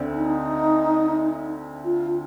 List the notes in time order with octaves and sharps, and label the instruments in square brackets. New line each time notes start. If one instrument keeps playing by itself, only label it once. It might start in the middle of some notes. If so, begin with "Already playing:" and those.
Already playing: [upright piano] D2 D3 C4
[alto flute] D#4
F4